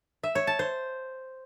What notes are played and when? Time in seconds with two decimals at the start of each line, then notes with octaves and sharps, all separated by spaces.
0.23 E5
0.35 C#5
0.47 A5
0.59 C5